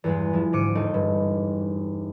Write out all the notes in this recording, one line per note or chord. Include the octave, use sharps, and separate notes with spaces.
E2 G2 G#3
F3 E4
D2 G#2 D6 C#7 D#7
E1 A3 D#4
G2